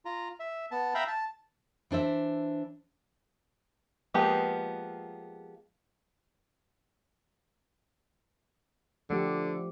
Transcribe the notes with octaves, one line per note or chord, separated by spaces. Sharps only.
F4 A#5
E5
B3 A5
E5 F5 G5 A#5 B5
A5
E3 D4 C5 E5
F3 G#3 A#3 B3 G4
D3 F3 A3 G4